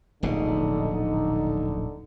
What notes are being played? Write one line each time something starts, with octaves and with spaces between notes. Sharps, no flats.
D1 A#1 B2 D3 D#4